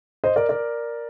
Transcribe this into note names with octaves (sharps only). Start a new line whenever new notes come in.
C5 D#5
A#4 D5
A#4 D5